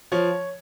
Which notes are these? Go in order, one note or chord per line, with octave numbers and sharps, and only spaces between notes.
F3 C#5